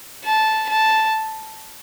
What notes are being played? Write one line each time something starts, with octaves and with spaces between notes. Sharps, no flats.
A5
A5